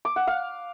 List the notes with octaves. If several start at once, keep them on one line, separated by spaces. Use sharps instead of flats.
D6
F#5
F5